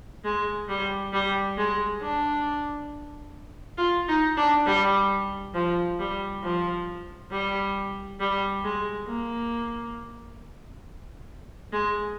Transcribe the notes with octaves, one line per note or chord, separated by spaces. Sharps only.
G#3
G3
G3
G#3
D4
F4
D#4
D4
G3
F3
G3
F3
G3
G3
G#3
A#3
G#3